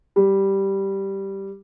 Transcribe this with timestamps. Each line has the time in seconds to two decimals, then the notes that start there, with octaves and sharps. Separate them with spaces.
0.16 G3